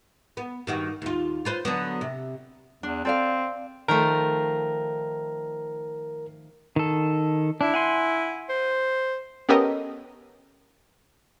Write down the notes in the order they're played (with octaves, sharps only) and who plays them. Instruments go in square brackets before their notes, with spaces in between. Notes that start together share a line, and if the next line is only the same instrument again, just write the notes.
[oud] B3
G2 D#3 F#4
D#2 F4
F4 B4 C5
D3 F#3 B3
C3
[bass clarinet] E2 [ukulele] D4
[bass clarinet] C4 [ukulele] A4 D5 F5
[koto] D#3 F3 A3 [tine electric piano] A#4
[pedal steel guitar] D#3 A4
[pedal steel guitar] D4 [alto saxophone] E4
[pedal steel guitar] F#5 G#5 C6
[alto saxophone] C5
[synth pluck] B3 C#4 G4 A4 A#4 D#5